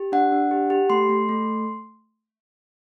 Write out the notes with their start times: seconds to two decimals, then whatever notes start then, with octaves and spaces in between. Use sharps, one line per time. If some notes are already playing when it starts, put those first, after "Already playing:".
Already playing: G4
0.12 D4 F#5
0.32 D4
0.51 G4
0.70 G4
0.90 A3 C6
1.09 A3
1.29 A3